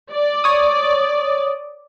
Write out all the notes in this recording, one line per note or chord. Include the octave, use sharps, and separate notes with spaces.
D5
C#5 D#6